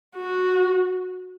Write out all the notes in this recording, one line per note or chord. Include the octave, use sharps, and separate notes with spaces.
F#4